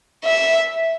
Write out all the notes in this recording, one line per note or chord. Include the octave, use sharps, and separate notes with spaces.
E5